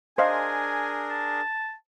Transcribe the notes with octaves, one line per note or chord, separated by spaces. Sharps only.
D4 G#4 A#4 C5 D#5 F5 G#5
A5